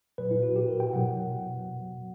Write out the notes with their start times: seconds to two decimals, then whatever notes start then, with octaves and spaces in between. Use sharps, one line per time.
0.18 A#2 F#3 B4
0.31 E4
0.43 F#4
0.56 G4
0.68 A#4
0.80 G5
0.93 B2 F#3 F#5